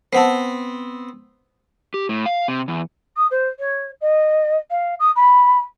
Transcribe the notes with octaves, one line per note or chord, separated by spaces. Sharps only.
B3 C4 C5 F#5 A5
G4
A2
F5
C3
E2
D#6
C5
C#5
D#5
F5
D#6
B5